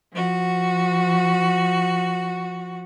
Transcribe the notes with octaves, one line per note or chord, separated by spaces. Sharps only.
F3 F#4